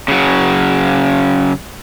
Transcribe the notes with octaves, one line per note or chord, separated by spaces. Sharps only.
C#3 F#3